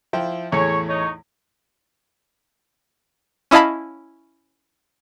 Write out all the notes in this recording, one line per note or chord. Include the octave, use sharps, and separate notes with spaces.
F3 E4 G5
E2 A2 G#4 C#5
D#4 C#5
C#4 E4 D#5 F5 A5 B5